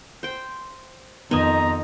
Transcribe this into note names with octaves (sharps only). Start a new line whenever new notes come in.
C5 G5
F2 D#3 B3 D#4 G#5 A#5 D#6